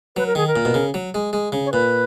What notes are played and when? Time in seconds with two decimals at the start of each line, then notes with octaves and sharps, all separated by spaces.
0.16 F#3 B4
0.26 A#4
0.35 D#3 G#4
0.47 A#4
0.56 A#2
0.65 B2
0.74 C#3
0.94 F#3
1.14 G#3
1.33 G#3
1.52 C#3
1.66 C#5
1.72 A#2 B4